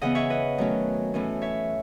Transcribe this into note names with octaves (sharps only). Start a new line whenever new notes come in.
C#3 E3 B3 D#5 F#5
C#5 E5
B4 D#5
D#3 F#3 A3 C#4
A2 E3 A3 C#4
C#5 E5